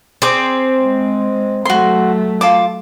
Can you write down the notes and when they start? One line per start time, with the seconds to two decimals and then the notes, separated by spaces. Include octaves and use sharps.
0.22 C4 G#4 D6
0.80 G#3
1.65 F#3 A3 F#4 C6
2.41 F4 A5 D6